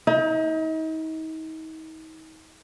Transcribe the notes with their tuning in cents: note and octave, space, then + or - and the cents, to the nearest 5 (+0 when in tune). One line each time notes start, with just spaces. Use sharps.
D#4 +40